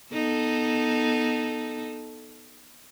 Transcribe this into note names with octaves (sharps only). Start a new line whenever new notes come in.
B3 D#4 A4